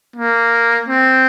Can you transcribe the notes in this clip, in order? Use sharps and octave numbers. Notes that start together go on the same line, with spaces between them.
A#3
C4